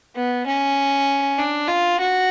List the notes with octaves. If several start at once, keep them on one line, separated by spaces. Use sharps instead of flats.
B3
C#4
D4
F4
F#4